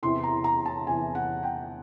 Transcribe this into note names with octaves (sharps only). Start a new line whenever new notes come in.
E2 C3 E3 C6
A#5
A#5
A5
E2 C3 E3 G#5
F#5
G5